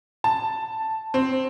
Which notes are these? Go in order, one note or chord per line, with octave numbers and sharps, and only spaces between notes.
A5
C4